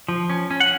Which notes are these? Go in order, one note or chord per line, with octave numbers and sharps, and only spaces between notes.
F3
C#4
C#4
F#5